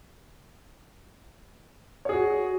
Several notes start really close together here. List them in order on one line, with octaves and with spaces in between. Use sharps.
C#5 G#4 F#4